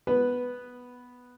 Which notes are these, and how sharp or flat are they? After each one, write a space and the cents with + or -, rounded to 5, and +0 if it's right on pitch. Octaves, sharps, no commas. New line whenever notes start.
B3 +0 B4 +0